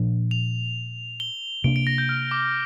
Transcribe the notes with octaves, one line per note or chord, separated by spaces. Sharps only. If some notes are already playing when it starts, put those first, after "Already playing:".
Already playing: A#2 F3 D4
F7
G7
C3 A#3 D4 D7
D7
A#6
G6
F6
D6